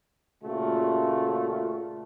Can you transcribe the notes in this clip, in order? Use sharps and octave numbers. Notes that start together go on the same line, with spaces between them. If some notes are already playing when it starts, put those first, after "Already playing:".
A#2 C#3 A3 F4 F#4